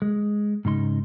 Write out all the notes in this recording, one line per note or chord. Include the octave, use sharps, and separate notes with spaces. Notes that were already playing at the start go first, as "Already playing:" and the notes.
G#3
G#2 C#3 D#4 C6